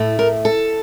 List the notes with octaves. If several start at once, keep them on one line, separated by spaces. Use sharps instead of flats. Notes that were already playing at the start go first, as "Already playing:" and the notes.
Already playing: A2 A3
A#4
A4